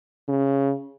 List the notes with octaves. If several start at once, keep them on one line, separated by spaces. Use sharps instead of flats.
C#3